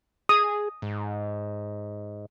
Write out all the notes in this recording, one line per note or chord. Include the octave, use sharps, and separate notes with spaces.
G#4 D#6
G#2